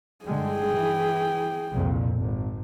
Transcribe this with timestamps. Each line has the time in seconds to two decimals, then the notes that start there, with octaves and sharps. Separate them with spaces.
0.25 G2 D3 G#3 G#4 G5
0.72 E3
1.71 C2 F2 A#2
2.15 G#1